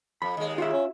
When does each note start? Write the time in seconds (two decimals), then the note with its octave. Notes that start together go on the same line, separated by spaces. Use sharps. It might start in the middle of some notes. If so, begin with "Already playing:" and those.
0.22 F2 B5
0.37 D#2 G#3
0.58 F4 F#4 E5
0.73 C#4